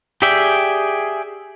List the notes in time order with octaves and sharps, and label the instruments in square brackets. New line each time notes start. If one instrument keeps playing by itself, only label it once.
[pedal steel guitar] G4 G#4 D5 E5 G5